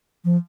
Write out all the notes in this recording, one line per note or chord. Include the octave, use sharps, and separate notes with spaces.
F3